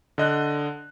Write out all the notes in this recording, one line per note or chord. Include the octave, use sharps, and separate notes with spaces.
D3 D#5 F#6